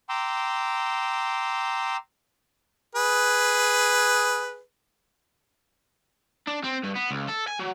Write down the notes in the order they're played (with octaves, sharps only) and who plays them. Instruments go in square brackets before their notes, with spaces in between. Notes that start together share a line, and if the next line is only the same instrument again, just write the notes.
[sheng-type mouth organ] G5 A#5 C6 D6 E6
[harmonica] G#4 B4
[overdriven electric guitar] D4
C4
G2
B3
C#2
A4
G#5
F#3